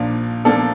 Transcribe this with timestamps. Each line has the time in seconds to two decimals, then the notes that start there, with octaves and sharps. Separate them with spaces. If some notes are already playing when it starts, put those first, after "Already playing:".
Already playing: A#1 A#2 F3 A#3 D4
0.45 A#2 F3 A#3 D4 A4